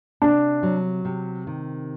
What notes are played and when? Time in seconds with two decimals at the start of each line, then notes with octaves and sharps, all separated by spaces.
0.22 C3 D4
0.63 F#3
1.05 C3
1.47 D#3